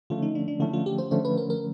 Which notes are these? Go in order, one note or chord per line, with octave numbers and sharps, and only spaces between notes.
D3 F3 A3 C#4 F4
D#4
D4
D4
D3 F3 A3 C#4 E4
F4
G4
C5
D3 F3 A3 C#4 C5
B4
A#4
A#4